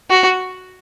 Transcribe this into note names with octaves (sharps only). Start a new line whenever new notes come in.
F#4